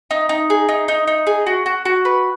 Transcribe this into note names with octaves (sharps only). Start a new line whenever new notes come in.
D#4
D#4
G#4
D#4
D#4
D#4
G#4
F#4
F#4
F#4
B4